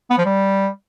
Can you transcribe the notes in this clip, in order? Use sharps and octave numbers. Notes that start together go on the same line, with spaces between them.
B3
F3
G3